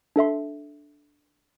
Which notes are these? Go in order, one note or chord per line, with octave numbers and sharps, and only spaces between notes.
D4 A4 E5 C6